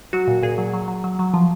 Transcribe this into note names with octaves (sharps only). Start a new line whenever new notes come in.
F#3 F#4
A#2
A#2 G#4
F#3
F#3
F#3
F#3
F#3
F3